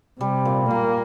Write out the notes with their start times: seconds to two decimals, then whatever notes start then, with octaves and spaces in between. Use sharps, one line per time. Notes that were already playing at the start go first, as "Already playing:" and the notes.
0.20 C3 G3
0.45 A#2
0.71 A#2 A#3